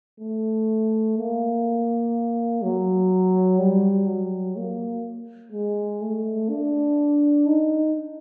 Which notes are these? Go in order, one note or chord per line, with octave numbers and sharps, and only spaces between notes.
A3
A#3
F#3
G3
F#3
A#3
G#3
A3
D4
D#4